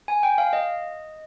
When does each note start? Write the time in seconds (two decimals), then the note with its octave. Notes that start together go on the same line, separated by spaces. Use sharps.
0.08 G#5
0.23 G5
0.38 F5
0.53 D#5